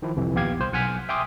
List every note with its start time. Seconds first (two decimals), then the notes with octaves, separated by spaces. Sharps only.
0.02 D#3 F3 E4
0.16 C2 F2 C3 E3
0.35 A#1 D#2 B3 G4 F5 G#6
0.59 C2 C5
0.73 B1 F#5 G#5 F6 B6
1.09 E5 G5 G#5 C6 D6 D#6